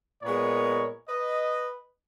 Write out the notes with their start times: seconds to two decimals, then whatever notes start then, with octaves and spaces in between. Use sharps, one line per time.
0.22 A#2 G#3 B3 A#4 C#5
1.09 B4 D#5